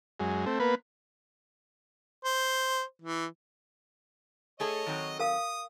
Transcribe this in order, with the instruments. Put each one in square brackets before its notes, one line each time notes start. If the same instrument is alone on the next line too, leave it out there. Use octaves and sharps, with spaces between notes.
[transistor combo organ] F#2 G#3
A3 C4
A#3 B3 B4
[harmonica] C5
E3
[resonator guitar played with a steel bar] A3 G#4 A4 [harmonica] C#5 D#5
[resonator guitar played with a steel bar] D#3 F#3 C4
[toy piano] A#4 F5 [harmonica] D#6